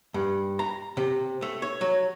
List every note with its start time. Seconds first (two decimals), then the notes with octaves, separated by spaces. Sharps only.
0.14 G2
0.59 A#5
0.97 C3
1.42 A3
1.62 C#5
1.81 F#3